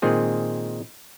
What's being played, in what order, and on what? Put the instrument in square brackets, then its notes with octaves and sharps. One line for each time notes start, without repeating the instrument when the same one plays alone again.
[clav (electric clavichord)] A#2 D#3 G#3 C4 G#4